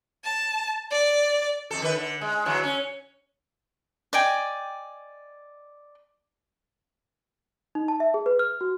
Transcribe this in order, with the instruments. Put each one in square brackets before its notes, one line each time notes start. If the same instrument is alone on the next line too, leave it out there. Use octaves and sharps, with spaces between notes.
[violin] A5
D5
[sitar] F2 A4
D#3 B4
D3
G#3
D3 E3 F#3
C#4
[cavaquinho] D5 D#5 G5 G#5
[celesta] D#4
A5
E5
G#4
B4
F6
F#4